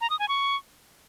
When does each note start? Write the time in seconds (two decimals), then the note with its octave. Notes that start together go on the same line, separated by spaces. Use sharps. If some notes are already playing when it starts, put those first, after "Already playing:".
0.01 A#5
0.10 D#6
0.19 G#5
0.29 C#6